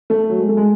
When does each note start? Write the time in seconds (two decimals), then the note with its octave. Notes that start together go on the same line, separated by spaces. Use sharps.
0.10 A3
0.30 F#3
0.38 G#3
0.49 A3
0.57 G#3